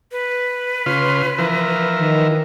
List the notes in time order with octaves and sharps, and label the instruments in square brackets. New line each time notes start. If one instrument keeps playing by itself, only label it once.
[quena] B4
[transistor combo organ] C#3 F4 C6
E3 F3 A#4
[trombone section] D#3